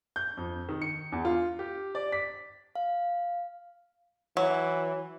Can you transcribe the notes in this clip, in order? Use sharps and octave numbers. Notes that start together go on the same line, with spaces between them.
G6
F2
D#3
C#7
E2
F4
G4
D5
B6
F5
E3 F#3